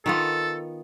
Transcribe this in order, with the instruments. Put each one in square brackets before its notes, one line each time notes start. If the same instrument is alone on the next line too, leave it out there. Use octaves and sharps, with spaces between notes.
[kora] D#3 B3 F4 [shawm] A4